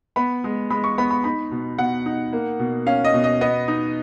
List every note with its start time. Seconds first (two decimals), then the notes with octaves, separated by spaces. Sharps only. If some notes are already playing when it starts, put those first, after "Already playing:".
0.16 B3 B5
0.44 G#3
0.70 G#3 B5
0.84 C#6
0.98 B3 B5
1.11 B5
1.24 D#4 B5
1.51 B2
1.78 B2 F#5
2.06 D#4
2.33 A#3
2.59 B2
2.86 C#4 F5
3.04 D#5
3.14 B2
3.24 D#5
3.41 B3 D#5
3.68 D#4